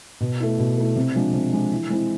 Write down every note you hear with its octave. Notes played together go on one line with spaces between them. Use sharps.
B2
A3 E4
B2
A3 E4
C3
F3 G#3 D4
C3
F3 G#3 D4
E3
G#3 C4 E4